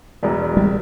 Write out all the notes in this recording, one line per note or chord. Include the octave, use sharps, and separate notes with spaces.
E1 E2
G3